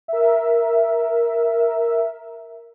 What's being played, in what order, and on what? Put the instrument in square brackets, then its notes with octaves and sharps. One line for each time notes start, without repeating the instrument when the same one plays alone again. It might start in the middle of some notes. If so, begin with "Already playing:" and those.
[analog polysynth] A#4 E5